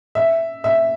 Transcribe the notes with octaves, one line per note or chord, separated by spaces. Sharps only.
E5
E5